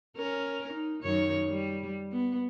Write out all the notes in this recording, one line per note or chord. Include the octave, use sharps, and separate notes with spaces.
C#4 A#4
D#4
F#2 D#3 C#5
G3
B3